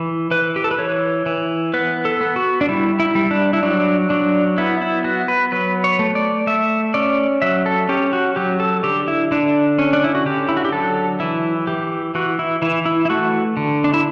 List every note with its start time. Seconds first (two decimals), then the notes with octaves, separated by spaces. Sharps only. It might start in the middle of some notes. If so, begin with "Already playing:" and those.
Already playing: E3
0.31 E3 B4
0.56 G4
0.64 A4
0.71 B4
0.78 E3 C#5
1.26 E3
1.74 B3 B4
2.05 A4
2.21 B3
2.36 F#4
2.61 D4
2.69 G3 E4
3.00 E4
3.15 G3
3.31 D4
3.53 E4
3.63 F#3 D4
4.10 F#3 D4
4.58 B3 E4
4.82 E4
5.04 B3 F#4
5.28 B4
5.52 F#3 B4
5.84 C#5
5.99 A3
6.15 D5
6.47 A3 E5
6.94 C#4 D5
7.42 F#3 E5
7.66 A4
7.89 C#4 G4
8.13 F#4
8.36 F#3 G4
8.60 A4
8.83 D3 G4
9.08 E4
9.32 D3 D4
9.79 C#4
9.93 D4
10.04 E4
10.15 F#4
10.26 D3 G4
10.49 E4
10.57 F#4
10.65 G4
10.73 F#3 A4
11.20 E3 E4
11.67 E3 G4
12.15 E3 F#4
12.39 E4
12.62 E3 E4
12.86 E4
13.05 E4
13.10 A3 F#4
13.57 D3
13.84 D4
13.94 E4